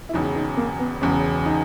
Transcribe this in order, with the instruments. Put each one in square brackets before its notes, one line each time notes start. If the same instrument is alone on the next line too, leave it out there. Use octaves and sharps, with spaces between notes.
[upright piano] E4
[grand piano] E1 E2 C#3 [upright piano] D#4
[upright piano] D#4
A#3
B3
[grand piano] E1 E2 C#3 [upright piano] C#4
[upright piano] D#4